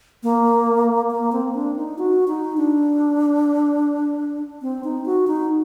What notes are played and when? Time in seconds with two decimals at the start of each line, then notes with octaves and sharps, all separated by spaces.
0.23 A#3
1.11 A#3
1.32 C4
1.55 D4
1.76 D#4
1.98 F#4
2.28 D#4
2.57 D4
4.62 C4
4.84 D#4
5.06 F#4
5.27 D#4